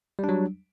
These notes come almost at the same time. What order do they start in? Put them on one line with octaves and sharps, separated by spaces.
G3 D4 F#3